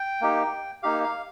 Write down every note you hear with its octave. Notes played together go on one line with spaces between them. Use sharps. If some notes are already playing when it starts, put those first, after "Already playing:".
Already playing: G5
A#3 D#4 G4
A#3 D#4 G4 F5
F5